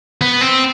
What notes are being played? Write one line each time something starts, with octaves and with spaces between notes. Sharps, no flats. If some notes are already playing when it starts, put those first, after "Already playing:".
B3
C4